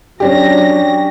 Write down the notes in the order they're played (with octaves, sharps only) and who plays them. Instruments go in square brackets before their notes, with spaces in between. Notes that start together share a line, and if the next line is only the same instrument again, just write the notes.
[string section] F#3 A#6 [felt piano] C#4 D4 G4